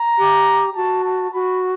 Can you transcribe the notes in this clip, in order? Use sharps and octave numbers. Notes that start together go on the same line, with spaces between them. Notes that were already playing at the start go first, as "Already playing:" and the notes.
Already playing: A#5
G4
F#4 A5
A5
F#4 B5